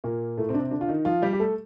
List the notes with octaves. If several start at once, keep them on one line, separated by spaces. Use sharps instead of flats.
A#2 A#3
A2 A3
C3 C4
D4
C3 C4
D3 D4
F4
D#3 D#4
F3 F4
G3 G4
G4
A3 A4